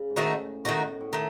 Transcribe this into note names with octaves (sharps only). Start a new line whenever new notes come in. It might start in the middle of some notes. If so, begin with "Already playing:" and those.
Already playing: C#3
G#2
A2 D#3 A3 D#4 F#4
A2 D#3 A3 D#4 F#4
A2
B2
A2
D#3 A3